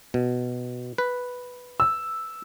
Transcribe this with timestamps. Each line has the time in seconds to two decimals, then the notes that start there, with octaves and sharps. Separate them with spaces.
0.14 B2
0.98 B4
1.80 E6